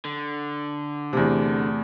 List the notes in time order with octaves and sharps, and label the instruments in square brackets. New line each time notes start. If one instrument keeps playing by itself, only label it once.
[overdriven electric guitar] D3
[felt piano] E2 C3 [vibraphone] A3